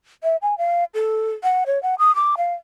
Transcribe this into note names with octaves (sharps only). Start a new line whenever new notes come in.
E5
G#5
F5
A4
F#5
C#5
F#5
D#6
D6
F5